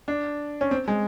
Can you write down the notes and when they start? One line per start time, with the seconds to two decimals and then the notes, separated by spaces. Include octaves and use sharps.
0.08 D4
0.61 C#4
0.71 C4
0.88 G#3